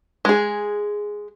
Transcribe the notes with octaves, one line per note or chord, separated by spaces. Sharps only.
G#3 G#4